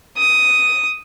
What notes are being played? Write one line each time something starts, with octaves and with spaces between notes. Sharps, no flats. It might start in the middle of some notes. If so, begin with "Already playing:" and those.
D#6